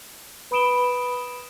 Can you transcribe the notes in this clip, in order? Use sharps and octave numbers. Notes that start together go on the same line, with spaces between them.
B4 B5 D#6 D7 E7 G7